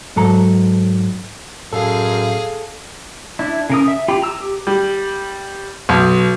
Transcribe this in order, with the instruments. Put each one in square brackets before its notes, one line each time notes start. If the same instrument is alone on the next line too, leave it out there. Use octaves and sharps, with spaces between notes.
[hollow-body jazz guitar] G#2 F#3 A4 A#5
[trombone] F#2 [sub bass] A2 [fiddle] G#4 F5 [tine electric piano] A4
[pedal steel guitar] D4 E4
C#3 A#4 D#6
E5
F4 G4 G5 B5
A#5 E6
G4
[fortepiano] G3
B1